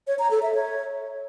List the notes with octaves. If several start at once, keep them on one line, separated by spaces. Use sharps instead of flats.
C#5
A#5
A4
E5
C#5